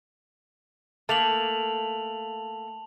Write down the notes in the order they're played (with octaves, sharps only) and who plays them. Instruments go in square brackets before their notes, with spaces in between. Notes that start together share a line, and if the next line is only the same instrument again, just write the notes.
[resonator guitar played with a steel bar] A3 A#3 [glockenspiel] A5 F7 F#7